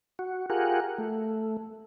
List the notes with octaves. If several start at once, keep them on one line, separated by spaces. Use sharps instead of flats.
F#4
F4 G4 G#4 A#4 F#5
A3